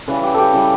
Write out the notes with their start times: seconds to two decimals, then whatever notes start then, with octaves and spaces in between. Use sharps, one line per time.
0.08 C#3 E3 G3 B4
0.23 G4
0.34 G4 A4
0.53 C#3 E3 G3